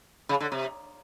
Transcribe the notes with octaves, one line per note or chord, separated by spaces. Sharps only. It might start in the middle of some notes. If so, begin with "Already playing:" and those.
C#3
D3
C3